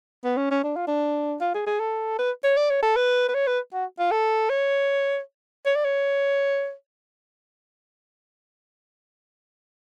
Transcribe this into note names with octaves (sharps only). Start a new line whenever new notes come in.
B3
C#4
C#4
D4
F4
D4
F4
G#4
G#4
A4
B4
C#5
D5
C#5
A4
B4
B4
C#5
B4
F#4
F4
A4
C#5
C#5
D5
C#5